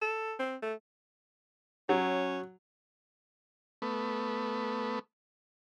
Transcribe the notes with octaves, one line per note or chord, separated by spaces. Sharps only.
A4
C4
A3
F#3 C#4
A3 B3